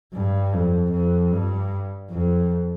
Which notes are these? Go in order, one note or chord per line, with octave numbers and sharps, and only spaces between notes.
G2
F2
F2
G2
F2